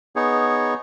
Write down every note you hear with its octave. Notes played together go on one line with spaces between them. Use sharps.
B3 D#4 G#4 C#5